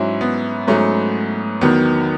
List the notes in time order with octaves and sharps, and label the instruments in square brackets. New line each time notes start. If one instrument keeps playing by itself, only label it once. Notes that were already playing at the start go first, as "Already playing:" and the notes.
Already playing: [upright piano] G#2 F#3 C#4 E4
B3
G#2 F#3 A3 C#4
E2 D#3 F#3 B3